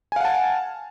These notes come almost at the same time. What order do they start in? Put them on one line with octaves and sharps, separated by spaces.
G#5 F5 F#5 A5